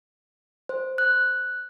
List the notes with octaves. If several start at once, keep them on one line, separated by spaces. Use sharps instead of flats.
C5
F#6